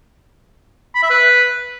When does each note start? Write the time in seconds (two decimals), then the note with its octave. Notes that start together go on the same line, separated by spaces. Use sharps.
0.95 B5
1.03 E5
1.10 B4